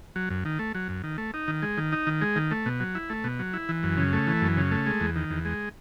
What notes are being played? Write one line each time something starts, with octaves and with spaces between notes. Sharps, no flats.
F#3
F#2
D#3
A3
F#3
F#2
D#3
A3
D#4
D#3
G#3
D#3
D#4
D#3
G#3
D#3
A3
B2
F#3
E4
A3
B2
F#3
E4
E3
F#2
C#3
A3
E3
F#2
C#3
A3
G#3
E2
D#3
E2
G#3